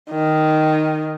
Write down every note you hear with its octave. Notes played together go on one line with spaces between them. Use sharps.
D#3